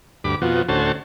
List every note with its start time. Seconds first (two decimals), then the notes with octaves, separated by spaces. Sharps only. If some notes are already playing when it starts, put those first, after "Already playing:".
0.24 D2 G2 B5 D6
0.42 F2 B2 F3 F#4
0.69 D2 A2 C#4 F#4 C5 A5